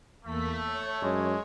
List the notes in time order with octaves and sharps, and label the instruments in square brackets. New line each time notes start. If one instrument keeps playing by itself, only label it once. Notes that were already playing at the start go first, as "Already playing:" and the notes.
[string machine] E2 A#3 B6 [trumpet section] A3
[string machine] C#5
[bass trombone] F#2 [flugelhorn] G#3